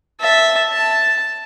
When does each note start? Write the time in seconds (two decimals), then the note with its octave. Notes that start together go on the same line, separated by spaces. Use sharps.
0.21 E5 A5
0.72 A5